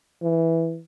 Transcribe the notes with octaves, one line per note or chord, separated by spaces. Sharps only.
E3